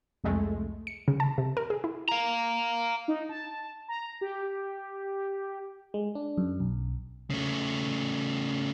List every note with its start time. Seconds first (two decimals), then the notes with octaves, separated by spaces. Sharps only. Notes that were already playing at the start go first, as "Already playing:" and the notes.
0.24 C2 F2 G#3 A3
0.87 C#7
1.08 C#3
1.20 A5
1.38 C3
1.57 A#4
1.70 G#4
1.84 E4
2.09 F5 A#5
3.08 D#4
3.29 A5
3.88 A#5
4.21 G4
5.94 G#3
6.15 D4
6.38 F#2
6.60 B1
7.30 C#3 A3